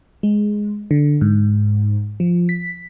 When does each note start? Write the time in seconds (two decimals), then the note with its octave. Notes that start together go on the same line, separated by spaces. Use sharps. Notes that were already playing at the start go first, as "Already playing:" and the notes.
0.23 G#3
0.91 D3
1.21 G#2
2.20 F3
2.49 B6